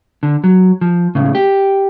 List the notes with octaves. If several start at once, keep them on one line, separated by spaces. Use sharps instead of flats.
D3
F#3
F3
C#2 A2 C#3
G4